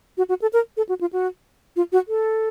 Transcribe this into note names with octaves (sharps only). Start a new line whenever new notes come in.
F#4
F#4
A4
A#4
A4
F#4
F4
F#4
F4
F#4
A4